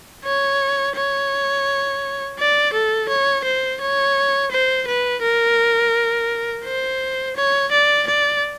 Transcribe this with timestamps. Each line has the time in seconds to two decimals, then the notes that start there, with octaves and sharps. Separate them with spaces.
0.25 C#5
0.96 C#5
2.39 D5
2.73 A4
3.09 C#5
3.45 C5
3.81 C#5
4.51 C5
4.87 B4
5.22 A#4
6.64 C5
7.36 C#5
7.71 D5
8.07 D5